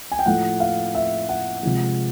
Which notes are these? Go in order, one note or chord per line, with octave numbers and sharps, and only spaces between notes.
G#5
G5
A2 F3 A3 F#5
F5
E5
F#5
C3 F3 G#3